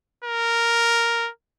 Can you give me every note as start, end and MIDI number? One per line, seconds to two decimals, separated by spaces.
0.24 1.30 70